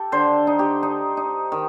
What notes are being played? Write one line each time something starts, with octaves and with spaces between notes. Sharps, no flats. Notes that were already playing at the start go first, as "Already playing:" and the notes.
Already playing: G4 A4
D3 C5
D#4
G4
D#4
D#4
D#3